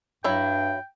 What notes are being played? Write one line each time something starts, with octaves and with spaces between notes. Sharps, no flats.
G2 F#3 E4 G5